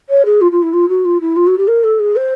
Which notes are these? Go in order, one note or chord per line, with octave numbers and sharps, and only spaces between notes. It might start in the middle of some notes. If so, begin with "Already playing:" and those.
C#5
G#4
F4
F4
E4
F4
F#4
F4
E4
F4
F#4
G4
A#4
A4
G#4
C5